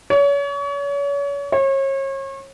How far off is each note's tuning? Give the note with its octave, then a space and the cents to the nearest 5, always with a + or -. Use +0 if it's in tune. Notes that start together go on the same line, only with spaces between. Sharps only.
C#5 +35
C#5 -35